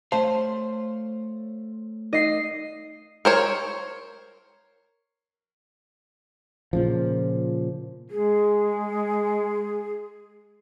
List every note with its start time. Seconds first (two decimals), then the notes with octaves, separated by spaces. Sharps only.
0.12 A3 C5 C#5 F5 A5
2.13 D#4 D#5 C7
3.25 A#4 C5 C#5
6.73 A#2 C#3 F3
8.11 G#3 G#4